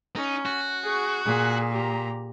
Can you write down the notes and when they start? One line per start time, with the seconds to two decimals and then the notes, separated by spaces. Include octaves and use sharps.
0.16 C#4 D#4
0.46 F#4
0.82 G#4 C#6
1.25 A#2 G#4
1.72 G4 A#5